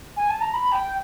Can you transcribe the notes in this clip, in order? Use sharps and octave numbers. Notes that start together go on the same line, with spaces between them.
G#5
A5
A#5
B5
G5